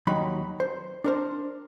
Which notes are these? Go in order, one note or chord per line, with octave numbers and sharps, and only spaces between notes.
D#2 F#3 D#4 B5
C5
D4 A#4 C5